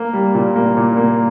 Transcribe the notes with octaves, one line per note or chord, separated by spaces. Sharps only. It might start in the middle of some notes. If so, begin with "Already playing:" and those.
Already playing: A#3
G3
A#2
A#3
A#2
A#3